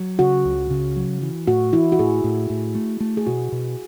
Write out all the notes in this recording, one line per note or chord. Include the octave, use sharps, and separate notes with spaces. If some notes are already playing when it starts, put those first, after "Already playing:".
Already playing: F#3
C#3 F#4
C#2
C#3
F#3
E3
A2 F#4
E3 E4
F#4
A2 G#4
A2
A2
A3
A3
G#4
B2 F#4
B2